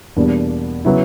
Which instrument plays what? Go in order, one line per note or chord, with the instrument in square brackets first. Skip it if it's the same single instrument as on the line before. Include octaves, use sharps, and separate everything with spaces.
[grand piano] E2 B2 G3 A#3 D4
C#3 F#3 B3 E4